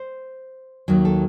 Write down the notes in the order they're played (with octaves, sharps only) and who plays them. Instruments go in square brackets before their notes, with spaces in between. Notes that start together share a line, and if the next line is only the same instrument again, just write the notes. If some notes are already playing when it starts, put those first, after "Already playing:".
Already playing: [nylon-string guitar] C5
D#2 D#3 F#3
A4